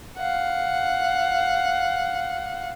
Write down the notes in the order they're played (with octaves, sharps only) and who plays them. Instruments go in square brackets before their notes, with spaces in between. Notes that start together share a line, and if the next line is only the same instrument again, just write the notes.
[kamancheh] F5 F#5